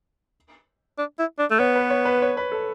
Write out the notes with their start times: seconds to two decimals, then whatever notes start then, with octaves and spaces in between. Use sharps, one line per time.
0.98 D4
1.19 E4
1.39 D4
1.51 A3
1.59 B3 C#5
1.76 B4
1.90 C#5
2.05 B4
2.22 C#5
2.37 B4
2.52 A4